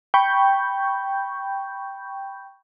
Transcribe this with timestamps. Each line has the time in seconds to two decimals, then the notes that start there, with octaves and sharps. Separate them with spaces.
0.14 G5 B5 C#6 G6